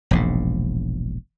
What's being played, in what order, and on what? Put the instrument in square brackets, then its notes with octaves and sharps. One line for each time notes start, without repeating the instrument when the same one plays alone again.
[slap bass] E1 A#1 G#2